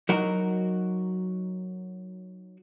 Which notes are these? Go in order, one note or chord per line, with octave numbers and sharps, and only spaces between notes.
F#3 D#4 F#4 A#4